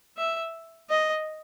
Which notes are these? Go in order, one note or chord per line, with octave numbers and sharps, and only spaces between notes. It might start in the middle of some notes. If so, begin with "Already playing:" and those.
E5
D#5